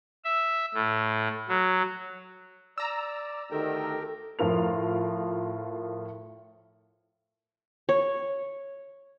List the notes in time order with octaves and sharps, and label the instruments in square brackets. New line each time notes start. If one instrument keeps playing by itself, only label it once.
[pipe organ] E5
A2
F#3
[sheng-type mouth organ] D5 [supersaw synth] A#5 E6
[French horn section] D2 D#3 [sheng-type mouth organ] G4 A#4 G5 [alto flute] A4
[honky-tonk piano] A2 F3 F4 A#4 F7
[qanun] C#5